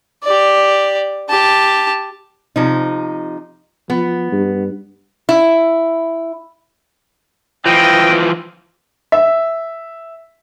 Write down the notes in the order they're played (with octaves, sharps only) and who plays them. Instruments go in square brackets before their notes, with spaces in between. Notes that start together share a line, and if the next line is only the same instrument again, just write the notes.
[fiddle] G4 D5
G4 A5
[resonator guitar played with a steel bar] C3 F3 D#4
[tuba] F3 [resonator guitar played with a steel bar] B3
[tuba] G2
[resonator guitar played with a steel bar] E4
[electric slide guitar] E3 F3 [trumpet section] D#5 G5
[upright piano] E5